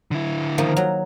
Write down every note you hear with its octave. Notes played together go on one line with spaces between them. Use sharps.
D3 E4
D#3 F3 A#3
F#3